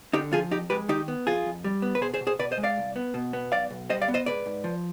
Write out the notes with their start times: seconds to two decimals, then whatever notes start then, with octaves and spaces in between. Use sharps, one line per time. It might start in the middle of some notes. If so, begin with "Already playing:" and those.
0.13 D3 D#4 G4
0.33 F3 F4 G#4
0.51 F2 D#4 G4
0.70 G#3 G4 B4
0.88 D#3 D#4 G4
1.08 B3
1.27 F2 F4 G#4
1.46 F2
1.64 G3
1.82 B3
1.95 B4
2.01 B2 G#4 C5
2.14 G#4 C5
2.21 B2
2.27 G#4 C5
2.39 B2 B4 D5
2.52 C5 D#5
2.58 G#3
2.64 D5 F5
2.77 C2
2.96 B3
3.14 B2
3.33 B3
3.52 B1 D5 F5
3.70 B1
3.90 G3 C5 D#5
4.02 D5 F5
4.08 B3
4.14 C5 D#5
4.26 G#2 B4 D5
4.46 G#2
4.64 F3